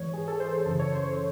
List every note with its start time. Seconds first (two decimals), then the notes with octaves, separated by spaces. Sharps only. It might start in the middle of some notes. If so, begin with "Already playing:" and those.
Already playing: G#2 E3 C#5
0.13 G#4
0.28 A4
0.40 C5
0.53 C5
0.66 F#2 C#3 E3 A4
0.79 C#5
0.92 C5
1.06 C#5